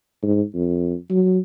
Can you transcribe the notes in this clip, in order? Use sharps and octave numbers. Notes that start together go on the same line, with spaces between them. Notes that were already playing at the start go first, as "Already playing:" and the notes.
G#2
F2
F#3